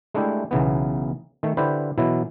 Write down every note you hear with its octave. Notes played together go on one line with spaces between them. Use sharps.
G#3 A3 D4 E4 G4
B1 C#3 E3 B3
D#3 A3
D3 E4 G4 B4 C5
B2 E3 F#3 E4